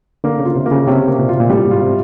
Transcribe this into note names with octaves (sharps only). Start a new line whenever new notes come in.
D3 A#3
C#3
F4
C3
A#3
C#3
C3 C#4
A#3
A#2
F4
A#2
A2 G3
G#2
F4
C3